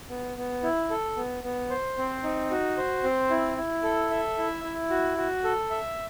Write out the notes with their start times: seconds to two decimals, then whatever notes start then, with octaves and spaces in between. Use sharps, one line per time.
0.10 B3
0.37 B3
0.63 E4
0.90 A4
1.17 B3
1.43 B3
1.70 C5
1.98 C4
2.24 D#4
2.51 F#4
2.77 C5
3.04 C4
3.30 E4
3.57 E4
3.83 A4
4.11 E5
4.38 E4
4.64 E4
4.90 F#4
5.17 F#4
5.44 A4
5.70 E5